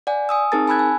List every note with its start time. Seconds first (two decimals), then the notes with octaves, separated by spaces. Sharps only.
0.07 D5 F#5 G#5
0.29 G#5 D#6 E6
0.52 C4 D#4 G#4 A#4 A5 A6
0.67 G#5 A5 B5 E6 F#6 G#6
0.79 G#5